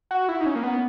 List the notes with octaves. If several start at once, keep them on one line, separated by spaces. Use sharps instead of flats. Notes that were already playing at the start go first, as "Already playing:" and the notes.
F#4
E4
D#4
C#4
A#3
B3